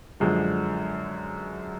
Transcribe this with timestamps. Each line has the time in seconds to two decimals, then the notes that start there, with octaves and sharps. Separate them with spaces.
0.20 F#2 D3 F3 G#3